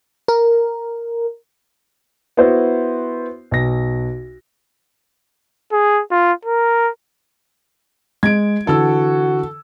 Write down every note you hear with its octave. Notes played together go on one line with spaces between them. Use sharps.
A#4
B3 E4 F#4 C5
B1 A#6
G#4
F4
A#4
G#3 G#6 D7
D3 E3 F#4 A4 E6